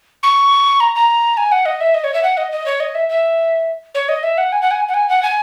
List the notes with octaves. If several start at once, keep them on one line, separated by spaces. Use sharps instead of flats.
C#6
A#5
A#5
G#5
F#5
D#5
E5
D#5
C#5
E5
F#5
D#5
D#5
C#5
D#5
E5
E5
C#5
D#5
E5
F#5
G#5
F#5
G#5
F#5
G#5
F#5
G#5